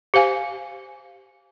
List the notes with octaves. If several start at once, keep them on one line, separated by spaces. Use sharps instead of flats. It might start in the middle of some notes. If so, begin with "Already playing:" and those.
G4 C5 F5 G#5